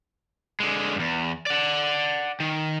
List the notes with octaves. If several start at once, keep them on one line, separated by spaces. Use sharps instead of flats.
D3 G#3
E2 G2
D5 F#5
D#3